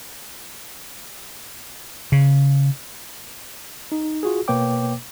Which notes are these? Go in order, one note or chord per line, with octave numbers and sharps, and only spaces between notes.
C#3
D#4
F4 F#4 G#4
B2 A#3 B4 C#5 G5 D6